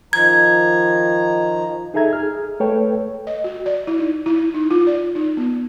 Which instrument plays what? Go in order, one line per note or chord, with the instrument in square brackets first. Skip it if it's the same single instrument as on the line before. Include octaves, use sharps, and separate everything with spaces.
[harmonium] D#3 F3 A#5 [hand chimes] G#6
[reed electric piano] D#4 G#4 A4 E5 A#5 G#6
G#4 F6
A3 A4 B4 C#5 G5
[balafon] D#5
F#4
D5
E4
D#4
E4
D#4
F4
D5
D#4
B3